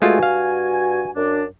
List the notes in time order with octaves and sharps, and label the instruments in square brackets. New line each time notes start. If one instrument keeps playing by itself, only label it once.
[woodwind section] G2 F#4 G#5 [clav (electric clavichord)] G#3 A3 F4
[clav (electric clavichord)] F5
[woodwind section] F#2 D4